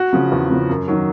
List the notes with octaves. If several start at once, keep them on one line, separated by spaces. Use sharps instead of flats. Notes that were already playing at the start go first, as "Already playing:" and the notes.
Already playing: F#4
C#3 F3
E2
C#3 F3
F#2
D#3 F#3